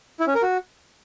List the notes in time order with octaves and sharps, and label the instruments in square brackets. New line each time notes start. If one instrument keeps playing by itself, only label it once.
[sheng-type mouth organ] E4
C#4
A#4
F#4